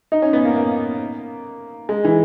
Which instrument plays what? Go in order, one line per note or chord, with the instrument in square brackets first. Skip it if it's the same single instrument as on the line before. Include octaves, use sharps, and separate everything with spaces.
[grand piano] D#4
C#4
B3
A#3
A#3
G#3
E3